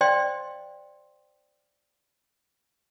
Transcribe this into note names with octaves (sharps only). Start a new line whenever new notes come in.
C5 D5 D#5 F5 G5 C6